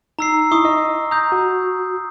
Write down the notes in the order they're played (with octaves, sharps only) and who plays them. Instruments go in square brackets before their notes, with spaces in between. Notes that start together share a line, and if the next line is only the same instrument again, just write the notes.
[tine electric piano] D#4 [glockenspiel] A#5 E6 C7
[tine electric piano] D#4 E4 [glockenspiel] C#6 D#6
[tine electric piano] D#5
[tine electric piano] A#5 [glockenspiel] D#6 G6
[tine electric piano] F#4